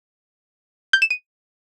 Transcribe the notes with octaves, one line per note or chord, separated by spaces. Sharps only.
G6
E7
D#7